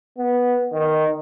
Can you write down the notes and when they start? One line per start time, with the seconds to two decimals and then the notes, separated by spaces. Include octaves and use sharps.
0.18 B3
0.73 D#3